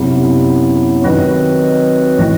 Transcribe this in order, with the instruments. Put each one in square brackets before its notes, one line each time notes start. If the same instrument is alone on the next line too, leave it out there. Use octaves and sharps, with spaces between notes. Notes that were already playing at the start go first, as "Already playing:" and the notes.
Already playing: [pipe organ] F#2 F#3 B3 E4 [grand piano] C3
[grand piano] D#3 [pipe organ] F#3 C4 F#4 B4 D#5
[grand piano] E3